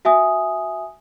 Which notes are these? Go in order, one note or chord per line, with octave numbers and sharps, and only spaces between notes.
F#4 E5 G#5 D#6